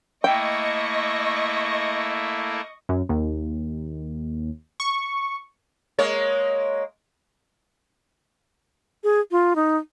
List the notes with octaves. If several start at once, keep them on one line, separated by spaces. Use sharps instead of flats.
A3 A#3 E4 D#5 G5 C#6
F#2
D#2
C#6
G#3 A#3 C#5
G#4
F4
D#4